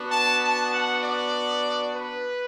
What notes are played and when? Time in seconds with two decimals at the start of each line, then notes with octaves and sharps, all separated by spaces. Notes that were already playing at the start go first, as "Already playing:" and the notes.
Already playing: B3 D4 F#4
0.10 A5
0.40 A5
0.71 F#5
1.03 D5
1.96 B4